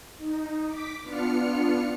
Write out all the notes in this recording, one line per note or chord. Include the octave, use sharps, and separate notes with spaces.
D#4
D6 B6
B3 D4 F4 F6 C#7